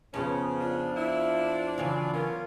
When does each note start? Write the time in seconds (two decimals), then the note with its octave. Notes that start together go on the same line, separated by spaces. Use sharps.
0.14 F2 C#3 B3 C#4 B4
0.60 D4 F4
0.97 E4
1.78 C#3 E3 F#3
2.13 B3 C#4 F4 A#4